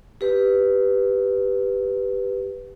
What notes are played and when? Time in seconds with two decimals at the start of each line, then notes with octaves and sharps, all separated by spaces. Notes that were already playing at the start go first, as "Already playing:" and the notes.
0.21 G4 B4